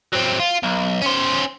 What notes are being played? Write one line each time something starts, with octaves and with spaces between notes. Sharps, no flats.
F#3 C4
F4
B1
C#4 C5